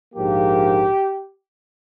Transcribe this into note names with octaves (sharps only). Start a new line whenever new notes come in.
A#1 G#2 F3 A#3 G4